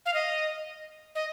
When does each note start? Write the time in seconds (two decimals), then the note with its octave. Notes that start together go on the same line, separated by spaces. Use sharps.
0.06 F5
0.14 D#5
1.15 D#5